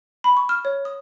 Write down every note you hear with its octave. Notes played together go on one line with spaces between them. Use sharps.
B5
C#6
F6
C#5
D#6